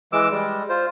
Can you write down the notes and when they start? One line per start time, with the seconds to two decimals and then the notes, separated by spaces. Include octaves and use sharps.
0.13 E3 G#3 D6 E6
0.32 G3 G#3
0.69 F4 C5